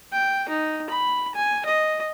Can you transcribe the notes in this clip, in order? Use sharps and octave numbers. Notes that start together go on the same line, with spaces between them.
G5
D#4
B5
G#5
D#5